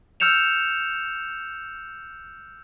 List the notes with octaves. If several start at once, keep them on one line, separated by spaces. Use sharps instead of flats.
E6 F6 G6 C#7 E7 F7